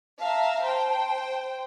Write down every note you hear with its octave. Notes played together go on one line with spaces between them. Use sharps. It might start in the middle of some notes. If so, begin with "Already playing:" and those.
E5 F5 A5 A#5
C5 G5